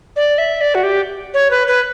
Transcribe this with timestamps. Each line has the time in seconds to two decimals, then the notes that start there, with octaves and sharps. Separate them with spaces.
0.16 D5
0.38 E5
0.61 D5
0.75 F#4
0.83 G4
1.34 C#5
1.51 B4
1.68 B4